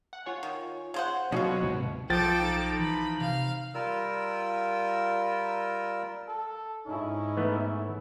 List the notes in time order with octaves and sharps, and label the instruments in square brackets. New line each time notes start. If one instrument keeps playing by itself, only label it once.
[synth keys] F#5
F4 C#5 G#5
[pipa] D#3
C#3 C5 F#5
[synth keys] B2 [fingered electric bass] F#3 [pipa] C4 F4 [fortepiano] C#4 F#4
[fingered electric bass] D2 G#2 C3
[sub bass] B1 [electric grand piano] F3 A6 [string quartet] A4 D6 [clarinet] G5
[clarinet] D#4
[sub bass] E3 [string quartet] B5
[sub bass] C3 [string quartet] F5
[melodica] G3 F4 A#4 E6
[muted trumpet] A4
[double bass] G#2 E4 [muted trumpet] C#4 [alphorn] D#4
[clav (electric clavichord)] E3 A3 B3